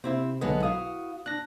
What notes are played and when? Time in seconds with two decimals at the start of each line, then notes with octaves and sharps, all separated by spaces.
0.04 C3 C4 E4 E5
0.41 B1 D3 F#3 G#3 B3 D#5
0.63 E4 F#4 F5 D#6
1.26 D4 F#6 A#6